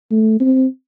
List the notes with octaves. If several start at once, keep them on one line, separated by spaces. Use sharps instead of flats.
A3
C4